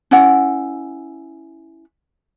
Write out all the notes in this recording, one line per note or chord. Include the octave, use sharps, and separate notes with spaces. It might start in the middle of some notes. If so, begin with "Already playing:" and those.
C#4 E4 F#5